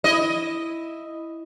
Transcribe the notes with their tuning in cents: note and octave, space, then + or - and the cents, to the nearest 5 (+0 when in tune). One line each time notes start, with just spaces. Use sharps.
E4 +0 D#5 +0